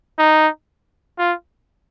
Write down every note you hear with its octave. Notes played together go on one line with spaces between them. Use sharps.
D#4
F4